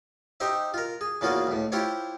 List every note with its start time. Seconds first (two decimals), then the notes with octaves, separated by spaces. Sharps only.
0.40 D#4 G4 C5 E5
0.74 F4 A#4
1.01 G#4
1.21 E2 C#3 A#3 F4 F#4 G#4
1.47 C#2 A2
1.72 E4 F4 G4 C5 C#5